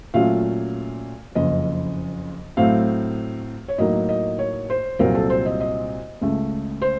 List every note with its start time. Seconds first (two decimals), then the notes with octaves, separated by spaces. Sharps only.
0.14 A#2 F#3 A3 C#4 F4 F5
1.35 F#1 F2 C#3 D#5
2.57 A2 F#3 A3 C4 F5
3.68 C#5
3.78 A2 F#3 A#3 D#4 D#5
4.09 D#5
4.39 C#5
4.70 C5
4.99 C2 A#2 F#3 C4 F4 A#4
5.15 A4
5.30 C5
5.46 D#5
5.60 D#5
6.21 C#2 C#3 A3
6.82 C5